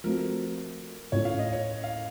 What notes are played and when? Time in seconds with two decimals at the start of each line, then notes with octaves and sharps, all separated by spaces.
0.04 F3 A3 C4 F#4 A#4
1.12 A2 A3 C#4 F4 C#5
1.25 F5
1.39 D#5
1.53 C#5
1.84 F5